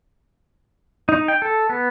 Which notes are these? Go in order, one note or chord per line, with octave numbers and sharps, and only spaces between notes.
D#4
G5
A4
B3